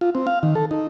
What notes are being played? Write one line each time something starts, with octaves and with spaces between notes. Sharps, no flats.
F4
C4
F5
D#3
A4
D#4